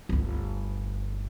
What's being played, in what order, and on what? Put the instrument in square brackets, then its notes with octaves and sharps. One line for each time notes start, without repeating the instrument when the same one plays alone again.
[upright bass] G1 D2